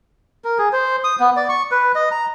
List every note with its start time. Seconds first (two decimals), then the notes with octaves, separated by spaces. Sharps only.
0.44 A#4
0.58 G#4
0.72 C5
1.04 D#6
1.20 B3
1.37 D5
1.49 C#6
1.71 B4
1.95 D#5
2.11 A#5